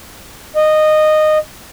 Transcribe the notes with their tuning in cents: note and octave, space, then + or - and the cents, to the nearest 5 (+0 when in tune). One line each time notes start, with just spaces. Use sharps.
D#5 -15